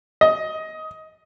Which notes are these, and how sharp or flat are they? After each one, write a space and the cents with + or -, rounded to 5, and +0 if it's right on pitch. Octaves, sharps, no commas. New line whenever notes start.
D#5 +15